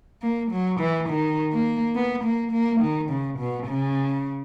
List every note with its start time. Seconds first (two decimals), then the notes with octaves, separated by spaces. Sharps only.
0.22 A#3
0.51 F#3
0.80 E3
1.09 D#3
1.52 A#3
1.95 B3
2.24 A#3
2.52 A#3
2.81 D#3
3.10 C#3
3.39 B2
3.67 C#3